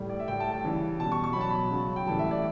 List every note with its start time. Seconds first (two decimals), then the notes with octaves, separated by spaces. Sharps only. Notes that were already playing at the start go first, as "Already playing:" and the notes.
Already playing: A2 G3
0.09 D5
0.19 E5
0.28 A2 G3 G5
0.40 A5
0.52 A5
0.64 C#3 E3 G3
1.00 B2 G3 A5
1.12 C#6
1.24 C#6
1.33 B2 F#3 B5
1.41 A5
1.50 B5
1.71 C#3 F#3
1.96 G5
2.07 A2 E3 G3 A5
2.19 E5
2.31 D5